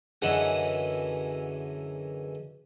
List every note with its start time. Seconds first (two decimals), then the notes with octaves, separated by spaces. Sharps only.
0.22 F#2 D3 E3 G#3 F#5